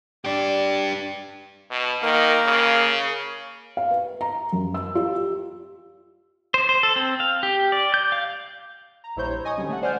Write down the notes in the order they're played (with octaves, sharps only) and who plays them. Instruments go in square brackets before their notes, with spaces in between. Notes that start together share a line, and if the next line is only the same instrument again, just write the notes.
[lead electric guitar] D4 G4 [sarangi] D5
[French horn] B2
[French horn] D#3 [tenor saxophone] A#3
[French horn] C#3
[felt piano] F5
B4
A#5
F#2
E6
F4
G4
[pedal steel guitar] C5
C5
A4
C4
F5
G4
D5
G6
F5
[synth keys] A#5
A#1 G3 E4 C5 C#5 G6
D#5 G#5 C#6 D#6
D3 D#3 F#3 G3 C#4
A3 F#5
C5 D5 F#5 G#5 F6 G6